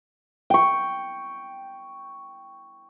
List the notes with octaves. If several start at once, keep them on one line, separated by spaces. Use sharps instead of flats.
G5 C#6